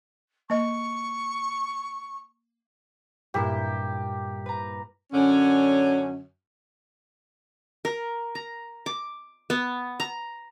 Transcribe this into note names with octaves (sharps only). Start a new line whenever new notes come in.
A#3 D#5 C#6
G2 A#2 E4 G4 A#4
B4 A#5
F#2 D3 C#4
A#4
A#5
D6
B3
A#5